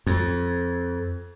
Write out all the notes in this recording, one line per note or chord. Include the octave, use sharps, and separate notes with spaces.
F2